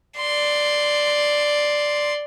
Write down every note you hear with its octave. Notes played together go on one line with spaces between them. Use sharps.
D5 C6